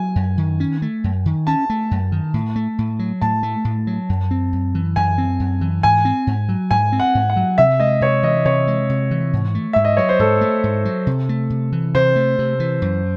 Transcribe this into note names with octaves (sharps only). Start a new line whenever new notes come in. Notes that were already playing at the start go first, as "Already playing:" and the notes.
Already playing: F#3 G#5
F#2
D#3
C#4
A3
F#2
D#3
C#4 A5
A3
F#2
D#3
A2
A3
A2
F#3
A2 A5
A3
A2
F#3
F#2
C4
F#2
E3
F#2 G#5
C4
F#2
E3
G#2 G#5
C4
G#2
F#3
G#2 G#5
C4
F#5
G#2
F#5
F#3
C3 E5
G#3 D#5
C3 C#5
E3 D#5
C3 C#5
G#3
C3
E3
G#2
A3
G#2 E5
D#5
F#3 C#5
C5
G#2 A4
A3
G#2
F#3
C3
A3
C3
E3
C3 C5
A3
C3
E3
F#2